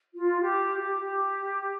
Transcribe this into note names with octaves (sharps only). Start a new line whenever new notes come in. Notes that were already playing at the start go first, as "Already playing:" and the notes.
F4
G4
G4